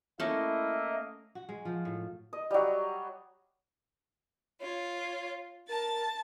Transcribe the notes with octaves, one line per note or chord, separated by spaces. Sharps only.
A3 A#3 C#4 E4 A#4 D#5 E5
F#4
G#3
F3
A2
D#5
F#3 G3
F4 C#5
A#4 A5 A6